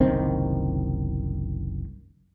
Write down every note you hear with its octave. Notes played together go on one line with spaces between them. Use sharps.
F#1 C2 D#3 C4